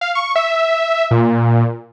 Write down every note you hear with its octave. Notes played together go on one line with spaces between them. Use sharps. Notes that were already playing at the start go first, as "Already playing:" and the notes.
F5
C#6
E5
A#2